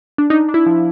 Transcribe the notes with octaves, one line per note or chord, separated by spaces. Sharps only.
D4
D4 D#4
D4
E4
F3